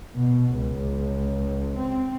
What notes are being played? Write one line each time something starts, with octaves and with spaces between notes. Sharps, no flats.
B2
C#2
C4